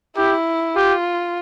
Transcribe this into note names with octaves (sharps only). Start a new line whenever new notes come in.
E4 G4
F4 G4